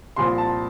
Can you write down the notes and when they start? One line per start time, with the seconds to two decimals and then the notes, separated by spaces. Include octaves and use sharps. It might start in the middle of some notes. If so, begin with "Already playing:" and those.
0.16 C2 A#2 F3 C6
0.38 A5